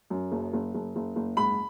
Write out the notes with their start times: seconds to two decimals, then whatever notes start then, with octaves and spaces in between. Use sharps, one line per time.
0.10 F#2
0.32 F#1
0.53 F#1
0.74 F#1
0.96 F#1
1.16 F#1
1.37 G#2 B5